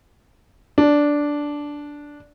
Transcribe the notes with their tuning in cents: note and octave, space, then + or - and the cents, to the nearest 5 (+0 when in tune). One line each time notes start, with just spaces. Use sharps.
D4 -5